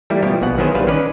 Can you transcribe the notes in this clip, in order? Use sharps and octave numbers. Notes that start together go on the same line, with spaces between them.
E3 G3 A3 A#3 E4
B2 F3 G3 B3 E4 G4
A#1 B2 F5 F#5
D#3 F#3 B3 E4 G#4 C5
A#1 G3 B4 C5 F5
D#3 C#4 B4 D5